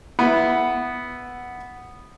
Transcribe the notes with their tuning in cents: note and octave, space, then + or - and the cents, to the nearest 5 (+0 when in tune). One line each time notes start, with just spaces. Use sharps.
B3 +0 E4 +0